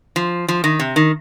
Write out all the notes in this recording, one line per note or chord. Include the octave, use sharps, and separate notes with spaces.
F3
F3
D#3
C3
D#3